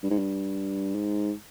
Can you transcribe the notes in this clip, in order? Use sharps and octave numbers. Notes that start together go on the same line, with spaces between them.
G2
G#2
G2
G#2